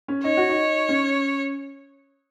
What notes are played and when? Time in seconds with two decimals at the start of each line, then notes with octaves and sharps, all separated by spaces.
0.08 C#4
0.24 D#4 C#5
0.37 F#4
0.49 D#4
0.89 C#4